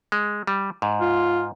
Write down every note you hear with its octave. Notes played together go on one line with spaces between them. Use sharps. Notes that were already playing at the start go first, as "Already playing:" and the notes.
G#3
G3
G#2
F4